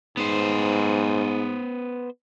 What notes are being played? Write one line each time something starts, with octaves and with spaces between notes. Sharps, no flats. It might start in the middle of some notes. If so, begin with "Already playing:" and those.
G#2 B3 C5